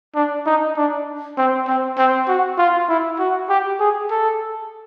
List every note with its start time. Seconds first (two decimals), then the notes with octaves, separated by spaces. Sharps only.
0.16 D4
0.46 D#4
0.77 D4
1.38 C4
1.68 C4
1.98 C4
2.28 F#4
2.58 F4
2.89 E4
3.19 F#4
3.49 G4
3.80 G#4
4.10 A4